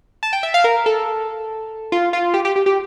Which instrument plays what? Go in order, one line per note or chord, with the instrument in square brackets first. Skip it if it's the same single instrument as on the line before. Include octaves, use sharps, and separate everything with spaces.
[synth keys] A5
G5
E5
F5
A#4
A4
F4
F4
G4
G4
G4
G4